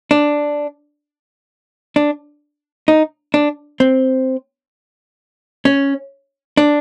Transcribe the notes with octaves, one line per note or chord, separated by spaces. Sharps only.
D4
D4
D#4
D4
C4
C#4
D4